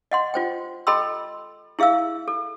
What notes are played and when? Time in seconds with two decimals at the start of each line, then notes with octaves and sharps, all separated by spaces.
0.12 D#5 F#5 C6
0.34 F4 C5 G5
0.87 A4 D#5 G5 B5 C6 E6
1.79 E4 G#4 E5 F5 E6
2.28 A4